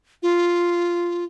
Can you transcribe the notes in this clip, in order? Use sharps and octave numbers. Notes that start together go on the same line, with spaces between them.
F4